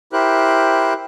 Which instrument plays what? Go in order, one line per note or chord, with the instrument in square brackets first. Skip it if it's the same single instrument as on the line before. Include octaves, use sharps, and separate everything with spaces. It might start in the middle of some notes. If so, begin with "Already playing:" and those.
[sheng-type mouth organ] E4 G4 A#4 C5 F#6